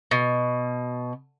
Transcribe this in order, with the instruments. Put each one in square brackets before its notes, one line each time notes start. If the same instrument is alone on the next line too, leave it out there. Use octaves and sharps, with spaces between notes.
[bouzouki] B2